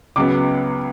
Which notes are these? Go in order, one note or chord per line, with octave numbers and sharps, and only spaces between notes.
C#2 C#3 F#3 B3 D6